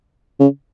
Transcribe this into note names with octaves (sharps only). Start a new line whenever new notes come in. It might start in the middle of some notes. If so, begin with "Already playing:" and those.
C#3